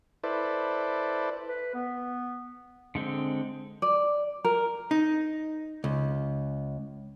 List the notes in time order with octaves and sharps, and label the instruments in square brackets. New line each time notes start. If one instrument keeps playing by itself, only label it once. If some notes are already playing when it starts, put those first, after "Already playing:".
[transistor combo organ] E4 A4 B4 C5 D5
[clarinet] B4
B3
[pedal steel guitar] D3 G#3 C4
[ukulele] D5
A#4
[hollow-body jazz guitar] D#4
C#2